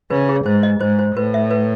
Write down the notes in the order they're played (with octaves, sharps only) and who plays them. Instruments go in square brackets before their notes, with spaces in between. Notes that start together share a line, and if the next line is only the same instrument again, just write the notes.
[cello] C#3 [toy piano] B4
[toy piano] G#4
[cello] G#2 [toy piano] C5
[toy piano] D#5
[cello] G#2 [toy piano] C5
[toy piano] C5
[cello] A2 [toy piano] B4
[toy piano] E5
B4